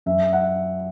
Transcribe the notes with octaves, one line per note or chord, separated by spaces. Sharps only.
F#2 E5
F#5